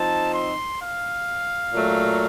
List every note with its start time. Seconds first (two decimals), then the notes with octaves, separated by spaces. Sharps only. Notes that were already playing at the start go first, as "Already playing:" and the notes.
Already playing: F3 C4 D#4 A5
0.33 C6
0.80 F5
1.73 A#2 F#3 A3